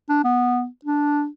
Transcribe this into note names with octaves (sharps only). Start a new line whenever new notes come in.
D4
B3
D4